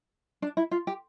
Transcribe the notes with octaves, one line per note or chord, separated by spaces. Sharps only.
D4
E4
F4
G4